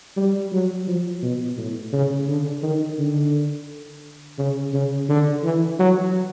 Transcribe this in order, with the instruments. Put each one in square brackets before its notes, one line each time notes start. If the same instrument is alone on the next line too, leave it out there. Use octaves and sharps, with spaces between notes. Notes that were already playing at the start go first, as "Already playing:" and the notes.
[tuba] G3
F#3
F3
B2
A2
C#3
D3
D#3
D3
C#3
C#3
D3
E3
F#3